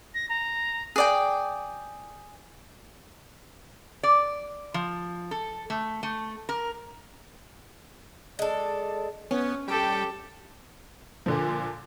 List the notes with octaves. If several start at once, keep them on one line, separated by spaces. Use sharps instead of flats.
A#6
A#5
G#4 D5 G5
D5
F3
A4
A3
A3
A#4
G#3 A4 D5
B3 C#4
G3 G4 A4 G5
A#2 D3 F3